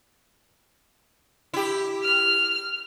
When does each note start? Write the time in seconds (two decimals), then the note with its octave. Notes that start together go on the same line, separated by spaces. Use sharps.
1.54 E4 G4
2.04 F6